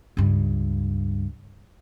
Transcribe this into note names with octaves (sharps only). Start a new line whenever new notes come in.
C#2 G2